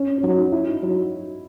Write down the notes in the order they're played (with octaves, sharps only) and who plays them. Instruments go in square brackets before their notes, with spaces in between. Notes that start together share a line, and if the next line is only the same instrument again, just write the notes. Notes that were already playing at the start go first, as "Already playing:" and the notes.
Already playing: [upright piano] C#4
C#4
[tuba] F#3 [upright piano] D#4
[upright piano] D#4
E4
D#4
[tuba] F#3